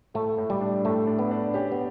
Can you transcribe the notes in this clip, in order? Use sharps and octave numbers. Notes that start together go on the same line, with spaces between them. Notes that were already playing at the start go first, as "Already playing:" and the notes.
A2 A3
A2
G3
D4
A2 A3
D4
B3
D4
C#4 G4
B3